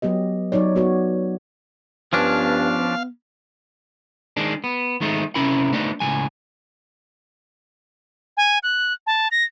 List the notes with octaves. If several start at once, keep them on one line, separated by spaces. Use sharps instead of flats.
F#3 B3 G4 D#5
F#3 D#4 C#5 D5
B3 F#4 C#5
G2 F3 B3 C#4 D4 F5
D#3 G#3 D4
B3
D#3 G#3 A3 D#4
C3 C#4 E4 A#4 B5
A3 B3 D4 D#4
C#2 A2 F#3 G#5
G#5
F#6
A5
A#6